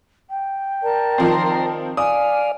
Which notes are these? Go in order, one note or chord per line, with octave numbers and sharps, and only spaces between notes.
G5
A#4 D5 A5
D#3 F3 C4 A#5 C6
D5 F5 G#5 D#6